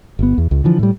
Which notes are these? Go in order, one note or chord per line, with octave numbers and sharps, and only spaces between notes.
G1 B3
E2
C#2
D3 E3 F3
A2 G3